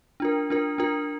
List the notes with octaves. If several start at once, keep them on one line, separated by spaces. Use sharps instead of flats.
D4 F4 A#4
D4 F4 A#4
D4 F4 A#4